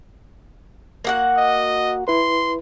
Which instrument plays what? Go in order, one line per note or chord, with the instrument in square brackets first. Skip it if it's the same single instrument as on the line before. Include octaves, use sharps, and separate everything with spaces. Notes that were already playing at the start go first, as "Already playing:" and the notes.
[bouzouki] A#3 F#4 F#5
[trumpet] D#5
[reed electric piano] E4 B4 [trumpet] C6